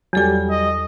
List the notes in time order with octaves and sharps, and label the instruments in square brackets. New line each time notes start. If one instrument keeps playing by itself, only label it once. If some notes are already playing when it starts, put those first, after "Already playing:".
[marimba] E2 A4 G#5 [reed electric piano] F#3 G3
[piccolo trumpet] D#5